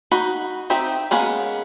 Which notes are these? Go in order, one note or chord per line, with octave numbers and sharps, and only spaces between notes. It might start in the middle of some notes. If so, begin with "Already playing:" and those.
D#4 F#4 B5
C4 D#4 G4 E5
G#3 A#3 B3 C#4